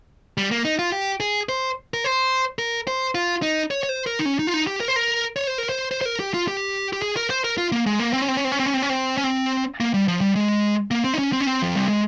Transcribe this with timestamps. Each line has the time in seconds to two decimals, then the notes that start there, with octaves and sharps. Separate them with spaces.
0.38 G3
0.51 A#3
0.65 D#4
0.79 F4
0.92 G4
1.20 G#4
1.49 C5
1.94 A#4
2.04 C5
2.59 A#4
2.87 C5
3.15 F4
3.42 D#4
3.71 C#5
3.83 C#5
3.89 C5
4.07 A#4
4.19 D#4
4.26 C#4
4.39 D#4
4.47 F4
4.54 D#4
4.67 G4
4.80 A#4
4.88 C5
4.96 A#4
5.36 C#5
5.47 C5
5.58 A#4
5.69 C5
5.91 C5
6.01 C5
6.06 A#4
6.20 G4
6.34 F4
6.48 G4
6.93 G4
7.02 G#4
7.17 A#4
7.30 C5
7.44 A#4
7.57 F4
7.72 A#3
7.86 G#3
7.99 A#3
8.13 C4
8.22 C#4
8.28 C4
8.37 C#4
8.45 C4
8.52 C#4
8.60 C4
8.66 C#4
8.74 C4
8.82 C#4
8.90 C4
9.18 C#4
9.24 C4
9.80 A#3
9.94 G3
10.08 F3
10.21 G3
10.36 G#3
10.91 A#3
11.04 C4
11.14 D#4
11.18 C#4
11.33 C4
11.40 C#4
11.46 C4
11.62 F3
11.75 G3
11.88 G#3